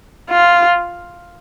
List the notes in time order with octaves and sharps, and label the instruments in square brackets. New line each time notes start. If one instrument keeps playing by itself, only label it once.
[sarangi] F4